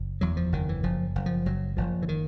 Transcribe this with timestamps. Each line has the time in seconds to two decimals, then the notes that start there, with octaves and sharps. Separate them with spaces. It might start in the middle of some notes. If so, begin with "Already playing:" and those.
Already playing: F#1
0.21 E2 F#3
0.37 F3
0.52 F#1 D#3
0.69 E3
0.83 F#1 F3
1.15 F#1
1.26 F3
1.46 F#1 F#3
1.77 F#1 F3
2.02 E3
2.09 D#3